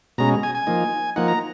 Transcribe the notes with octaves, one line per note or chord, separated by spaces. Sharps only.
B2 G#3 C#4 A#5
G#5
G#5
F3 A#3 D#4
F3 A#3 D#4 F#5
A#5